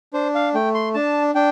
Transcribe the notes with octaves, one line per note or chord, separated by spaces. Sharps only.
D4 C5
F5
A3 G5
C6
D4 A5
D4 G5